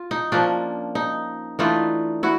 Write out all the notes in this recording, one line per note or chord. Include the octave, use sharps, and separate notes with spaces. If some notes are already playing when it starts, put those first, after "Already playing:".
Already playing: F4
D#4
F3 A#3 C#4 D4
D#4
E3 A3 D4 D#4 F4
E4 F#4